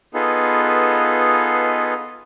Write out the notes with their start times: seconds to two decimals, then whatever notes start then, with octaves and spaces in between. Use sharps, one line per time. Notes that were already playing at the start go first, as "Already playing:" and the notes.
0.14 B3 D#4 F4 G#4 A4 B4